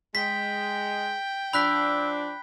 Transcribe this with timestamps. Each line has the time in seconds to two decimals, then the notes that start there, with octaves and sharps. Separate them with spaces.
0.15 G#3 G5 B6
1.53 F3 D4 B5 E6 F#6 B6